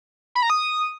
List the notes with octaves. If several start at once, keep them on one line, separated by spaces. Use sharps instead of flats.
B5
A#5
D#6